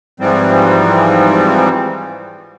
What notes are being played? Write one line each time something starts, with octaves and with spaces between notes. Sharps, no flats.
G#2 E3 F3 G3 C4